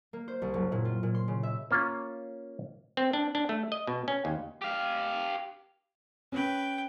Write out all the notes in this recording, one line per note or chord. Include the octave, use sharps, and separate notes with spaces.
A#3
C5
C2
F#1
A#2
F4
A#2
C6
C#3
E5
A#3 C#4 F4
C4
D4
D4
A3
D#5
B2
C#4
D#2
G4 F5
C#4 B4 G5